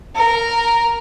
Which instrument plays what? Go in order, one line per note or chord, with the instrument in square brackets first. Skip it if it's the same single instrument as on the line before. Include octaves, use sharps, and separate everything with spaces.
[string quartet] A#4